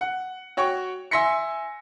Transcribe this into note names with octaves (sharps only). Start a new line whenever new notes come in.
F#5
F#4 C#5 G5 C#6
E5 G#5 C6 A#6 B6 C#7